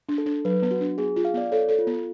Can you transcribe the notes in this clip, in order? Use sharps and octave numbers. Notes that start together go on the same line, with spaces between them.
D4
A4
D4
F#3 B4
B3
F#4
D4
B3 G#4
F4
F5
B3 D5
A4 C#5
A4
F4
B3